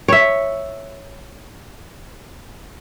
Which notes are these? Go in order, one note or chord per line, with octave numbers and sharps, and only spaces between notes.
C#5 E5